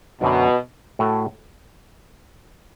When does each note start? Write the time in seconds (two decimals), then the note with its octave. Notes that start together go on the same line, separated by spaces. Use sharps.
0.21 F#2 B2 D3 F#3 D4
0.99 A2 A3 F#4 A4